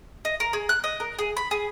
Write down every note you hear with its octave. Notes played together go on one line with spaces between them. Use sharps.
D#5
A#4
G#4
F#6
D#5
A#4
G#4
B5
G#4